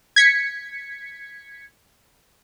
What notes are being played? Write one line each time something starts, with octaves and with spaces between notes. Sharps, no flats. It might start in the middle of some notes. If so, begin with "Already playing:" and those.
G#6 B6 C#7